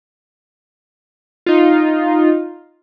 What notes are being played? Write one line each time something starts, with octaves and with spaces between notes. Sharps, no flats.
D#4 F4